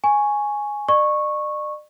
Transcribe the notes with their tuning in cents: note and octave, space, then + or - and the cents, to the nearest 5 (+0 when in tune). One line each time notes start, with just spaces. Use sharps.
G#5 +0 C#6 +0
D5 +40 C#6 -10